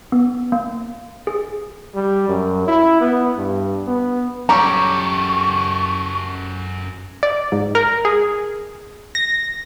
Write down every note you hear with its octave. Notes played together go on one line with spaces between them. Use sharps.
B3
A#3
G#4
G3
F#2
E4
B3
G2
B3
F#2 G3 G4 A4 C#5 A#5 C#6
D5
G#2
A#4
G#4
A#6